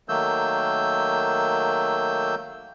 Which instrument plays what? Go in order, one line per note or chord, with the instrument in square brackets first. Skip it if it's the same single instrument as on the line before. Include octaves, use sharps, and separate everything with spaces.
[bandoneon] D#3 F#3 A3 A#3 E6 G6